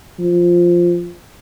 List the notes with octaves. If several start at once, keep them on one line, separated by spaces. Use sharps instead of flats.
F3